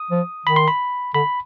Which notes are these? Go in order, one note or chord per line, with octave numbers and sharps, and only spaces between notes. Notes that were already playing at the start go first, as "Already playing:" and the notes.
Already playing: D#6
F3
D#3 B5
C6
B5
D3 B5